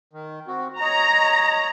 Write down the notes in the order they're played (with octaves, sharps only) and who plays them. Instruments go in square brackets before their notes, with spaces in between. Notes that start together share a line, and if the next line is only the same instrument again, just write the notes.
[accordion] D#3
C4 F#4
[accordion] C#5 D#5 [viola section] A#5